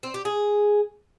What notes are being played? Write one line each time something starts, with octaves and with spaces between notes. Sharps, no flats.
C4
G4
G#4